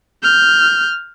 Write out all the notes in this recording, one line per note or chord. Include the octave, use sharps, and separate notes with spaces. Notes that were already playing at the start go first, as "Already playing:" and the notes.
F6 G6